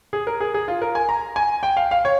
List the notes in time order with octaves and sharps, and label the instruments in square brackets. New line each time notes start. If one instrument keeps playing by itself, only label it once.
[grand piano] G#4
A#4
G#4
G#4
F4
A#4
G#5
A#5
G#5
G5
F5
F5
C#5